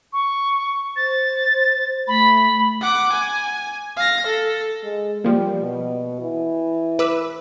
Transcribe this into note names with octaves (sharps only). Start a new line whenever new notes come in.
C#6
C5 A6
A3 B5
F#5 D6
G#5
F5 A#6
A4
G#3
F3 G3 A#3
B2
E3
B4 D6 E6